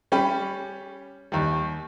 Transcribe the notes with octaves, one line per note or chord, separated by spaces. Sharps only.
G3 C#4 G4 B5
D#2 G3